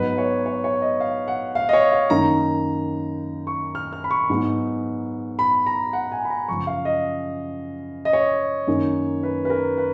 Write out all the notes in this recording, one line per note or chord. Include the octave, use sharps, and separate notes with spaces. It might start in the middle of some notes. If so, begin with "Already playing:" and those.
Already playing: G#2 F#3 B3 D#4 B4
C#5
C#5
C#5
D#5
F5
F#5
F5
D#5
C#5
F5
F#2 D#3 A#3 D#4 A#5
C#6
F6
F6
B5
C#6
G#2 F#3 B3 D#4
B5
A#5
F#5
G#5
B5
A#5
F#2 C#3 F3 C#6
F5
D#5
D#5
C#5
F#2 D#3 A#3 D#4
B4
B4
A#4
B4